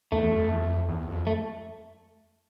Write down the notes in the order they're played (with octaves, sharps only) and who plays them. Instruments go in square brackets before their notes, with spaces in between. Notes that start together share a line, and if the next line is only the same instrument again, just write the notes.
[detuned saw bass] E2 [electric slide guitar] A3
[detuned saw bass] F#2
F2
E2
F2
E2
F2
[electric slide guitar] A3